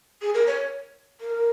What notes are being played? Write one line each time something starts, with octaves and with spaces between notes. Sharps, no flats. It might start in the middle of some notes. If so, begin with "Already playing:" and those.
G#4
A#4
C#5
A#4